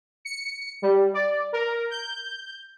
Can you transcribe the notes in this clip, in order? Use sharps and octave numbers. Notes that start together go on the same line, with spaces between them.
C#7
G3
D5
A#4
G6